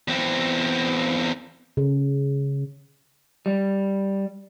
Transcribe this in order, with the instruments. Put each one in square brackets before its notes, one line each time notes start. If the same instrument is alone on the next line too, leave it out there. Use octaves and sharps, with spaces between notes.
[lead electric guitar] E2 C4
[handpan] C#3
[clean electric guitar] G3